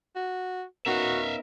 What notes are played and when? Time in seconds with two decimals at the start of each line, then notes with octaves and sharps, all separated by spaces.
0.16 F#4
0.86 B3 C#4 D#4 F#4 A#4 E5 F5